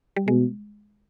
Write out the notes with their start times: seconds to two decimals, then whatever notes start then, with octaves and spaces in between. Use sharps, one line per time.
0.17 G3
0.28 B2 G#3